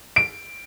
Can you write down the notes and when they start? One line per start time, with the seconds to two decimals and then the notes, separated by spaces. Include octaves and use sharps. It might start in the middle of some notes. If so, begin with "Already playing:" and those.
0.16 D7